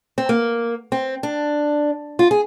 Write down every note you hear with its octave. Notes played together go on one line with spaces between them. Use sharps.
C4
A#3
C4
D4
F4
G#4